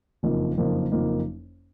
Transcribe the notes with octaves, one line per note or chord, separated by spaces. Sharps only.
F#1 F2 F3 A#3 D#4
F#1 F2 F3 A#3 D#4
F#1 F2 F3 A#3 D#4